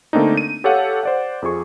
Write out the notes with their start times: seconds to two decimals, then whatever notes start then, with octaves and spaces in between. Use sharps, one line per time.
0.13 D3 A3 A#3 C4 D4 D#4
0.37 D#7
0.64 G4 A4 C#5 F5 F#5
1.03 C5 D5 F#5
1.42 F2 F3 G#4 C#6